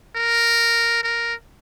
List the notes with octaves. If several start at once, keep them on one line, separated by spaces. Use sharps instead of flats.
A#4
A#4